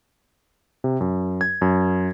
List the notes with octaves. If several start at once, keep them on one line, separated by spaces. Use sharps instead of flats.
C3
F#2
G#6
F#2